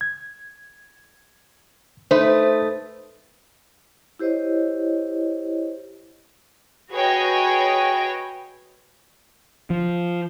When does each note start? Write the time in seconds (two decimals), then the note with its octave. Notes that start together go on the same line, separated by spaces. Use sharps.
0.01 G#6
2.11 A3 D#4 B4 C5
4.19 E4 G4 C5 C#5 D#5
6.91 F#4 G#4 B4 C#5 D#5 G5
9.70 F3